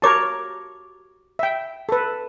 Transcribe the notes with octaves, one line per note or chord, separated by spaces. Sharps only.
F#4 G4 A#4 C#5 A5 D6
E5 G5
A4 B4